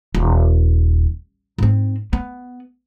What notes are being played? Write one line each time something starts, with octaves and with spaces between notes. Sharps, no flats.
D#1
G#2 C4
B3